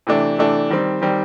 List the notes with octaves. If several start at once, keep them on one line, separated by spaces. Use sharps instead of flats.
C3 E3 A3 D4
C3 E3 A3 D4
D#3 G3 C4
D#3 G3 C4